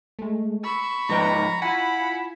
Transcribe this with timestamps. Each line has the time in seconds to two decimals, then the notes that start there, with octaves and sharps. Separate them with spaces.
0.19 G#3 A3
0.64 B5 C#6 E6
1.09 G#2 F3 D#4 B4 D#5 G5 A#5
1.62 E4 F4 F#5 G#5 B5